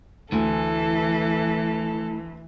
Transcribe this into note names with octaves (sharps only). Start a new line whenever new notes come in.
D2 E3 A3 E4 A4 G#5